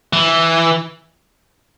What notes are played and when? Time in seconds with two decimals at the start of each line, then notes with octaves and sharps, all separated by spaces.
0.13 E3